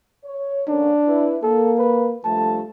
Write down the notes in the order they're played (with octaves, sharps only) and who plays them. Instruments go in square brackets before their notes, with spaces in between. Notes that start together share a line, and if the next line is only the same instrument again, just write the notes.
[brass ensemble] C#5
[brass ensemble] D3 A#3 C#4 [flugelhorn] D4
[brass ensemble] E4 B4
[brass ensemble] A#3 [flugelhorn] A4
[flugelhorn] B4
[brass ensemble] G2 F3 A3 [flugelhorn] A5